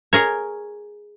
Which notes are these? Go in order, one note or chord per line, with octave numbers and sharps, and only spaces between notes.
G#4 A#4 C#5